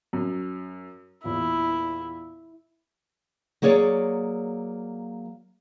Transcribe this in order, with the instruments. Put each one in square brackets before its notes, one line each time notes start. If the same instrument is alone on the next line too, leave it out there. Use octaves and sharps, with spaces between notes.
[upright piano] F#2
[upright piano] E2 A#2 [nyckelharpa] E4
[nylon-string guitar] F#3 A#3 G#4 C#5 D5